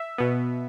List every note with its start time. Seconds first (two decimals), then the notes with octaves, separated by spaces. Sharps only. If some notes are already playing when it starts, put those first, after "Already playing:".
Already playing: E5
0.18 B2 B3